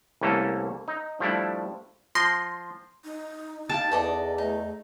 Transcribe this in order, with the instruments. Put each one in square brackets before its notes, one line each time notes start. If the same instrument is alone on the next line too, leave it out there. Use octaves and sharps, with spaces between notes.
[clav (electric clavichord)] C2 E3 A3 A#3 C#4 A4
D#4
F3 G3 A3 D4 E4
[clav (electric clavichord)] F3 [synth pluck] C6 [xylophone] A#6
[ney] D#4
[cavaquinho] G4 F5 [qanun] A5
[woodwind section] E2 [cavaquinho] A4 D5 D#5
[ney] A3 [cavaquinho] D#4